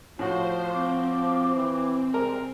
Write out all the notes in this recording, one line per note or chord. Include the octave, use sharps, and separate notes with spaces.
A2 F3 F#4 C5
C4 D6
E3
C3 G3 G#3 A#4